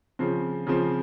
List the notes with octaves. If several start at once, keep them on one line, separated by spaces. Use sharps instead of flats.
C#3 F3 C4
C#3 F3 C4